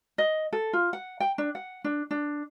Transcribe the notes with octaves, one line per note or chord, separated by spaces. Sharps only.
D#5
A4
F4
F#5
G5
D4
F#5
D4
D4